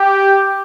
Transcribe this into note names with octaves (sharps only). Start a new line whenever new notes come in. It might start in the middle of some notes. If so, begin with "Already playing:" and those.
Already playing: G4